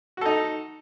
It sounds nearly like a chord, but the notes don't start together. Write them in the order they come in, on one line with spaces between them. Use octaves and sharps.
F#4 A4 D#4